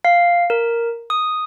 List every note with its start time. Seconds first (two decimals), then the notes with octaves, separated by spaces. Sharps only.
0.05 F5
0.50 A#4
1.10 D#6